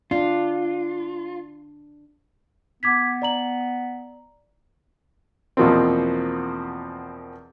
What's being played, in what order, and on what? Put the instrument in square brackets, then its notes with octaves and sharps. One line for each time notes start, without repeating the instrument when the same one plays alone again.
[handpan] D4 [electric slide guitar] F4
[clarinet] B3 [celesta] D6 G#6 B6
[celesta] D5 A#5 F#7
[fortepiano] E2 B2 F3 A#3 C4